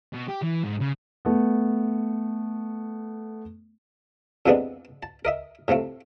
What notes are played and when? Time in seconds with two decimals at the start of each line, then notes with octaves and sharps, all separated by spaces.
0.13 B2
0.28 G4
0.43 E3
0.64 G#2
0.80 C#3
1.25 A3 B3
4.46 F2 C3 E3 G#3 B3 D4
5.03 A5
5.25 A#4 D#5 E5
5.68 A2 C3 F3 A3